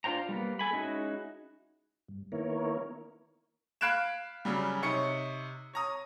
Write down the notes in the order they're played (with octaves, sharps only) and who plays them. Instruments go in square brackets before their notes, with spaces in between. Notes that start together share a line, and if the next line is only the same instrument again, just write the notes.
[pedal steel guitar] D4 F4 C5 G5 A#5
G3 A#3 B3
A4 G#5 B5
G#3 C#4 D#4 E4 F#4
[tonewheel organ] G2
D#3 A#3 B3 E4 A#4 C#5
[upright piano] F5 B5 F#6 G#6 D7 E7
C#3 F#3 G3
C3 D#4 C#5 C#7
C#5 A#5 D#6